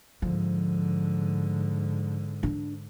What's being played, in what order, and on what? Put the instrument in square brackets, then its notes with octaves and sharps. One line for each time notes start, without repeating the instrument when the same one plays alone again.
[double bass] G#2 D3 [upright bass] F3
[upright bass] D4